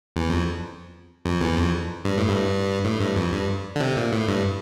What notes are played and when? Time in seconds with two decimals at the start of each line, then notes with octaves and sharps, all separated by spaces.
0.16 E2
0.29 F2
1.25 F2
1.41 E2
1.57 F2
2.05 G2
2.17 A2
2.29 G2
2.85 A2
3.00 G2
3.16 F2
3.33 G2
3.76 D3
3.80 C3
3.96 A#2
4.13 A2
4.28 G2